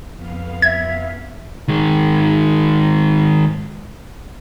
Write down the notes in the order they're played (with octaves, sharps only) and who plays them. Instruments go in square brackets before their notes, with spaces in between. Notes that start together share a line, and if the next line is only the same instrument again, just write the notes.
[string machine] F2 B3 F5
[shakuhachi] E5 [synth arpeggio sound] G#6
[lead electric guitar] D#3 G#3